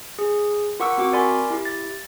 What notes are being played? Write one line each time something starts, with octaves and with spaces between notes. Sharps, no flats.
G#4
F4 A#4 F#5 C#6 D6 E6
C4 F#4 D6
A#4 D5 G#5 B5 C6 D6
E4 G4
A6